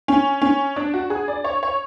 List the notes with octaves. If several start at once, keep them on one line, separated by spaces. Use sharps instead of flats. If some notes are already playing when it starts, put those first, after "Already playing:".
C#4
C#4
D4
F#4
G#4
D5
C#5
C#5